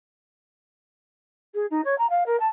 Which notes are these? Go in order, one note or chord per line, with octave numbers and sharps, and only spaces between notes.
G#4
D#4
C#5
A#5
F5
A#4
A5